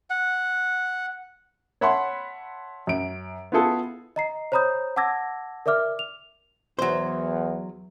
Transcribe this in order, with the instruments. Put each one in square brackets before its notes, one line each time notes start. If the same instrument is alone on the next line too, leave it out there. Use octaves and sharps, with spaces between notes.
[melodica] F#5
[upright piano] C#5 E5 F#5 A5 B5 C6
F#2 D7
B3 E4 F4 G#4 A4
[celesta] D#5 A#5 C7
C5 C#5 A#5 B5 D#6 G6
F#5 A5 D6 E6 G#6 A#6
A#4 D5 E5 D6 F6
F7
[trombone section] E2 [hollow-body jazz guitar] F#3 C5